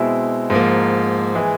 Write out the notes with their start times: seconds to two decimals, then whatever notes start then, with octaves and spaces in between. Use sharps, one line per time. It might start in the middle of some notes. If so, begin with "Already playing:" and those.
Already playing: B2 G#3 C4 E4
0.50 G#2 F3 A#3
1.35 E3 G#3